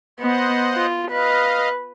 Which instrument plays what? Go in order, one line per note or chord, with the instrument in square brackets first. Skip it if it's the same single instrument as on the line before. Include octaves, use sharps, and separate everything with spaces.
[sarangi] B3 [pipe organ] C5 D#5 F#5
[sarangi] F4
[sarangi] B4 [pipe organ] D#5 F5